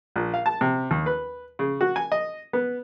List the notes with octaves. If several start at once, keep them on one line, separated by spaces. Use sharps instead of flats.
A#1
F5
A5
C3
D#2
B4
C#3
F#4
G#5
D#5
B3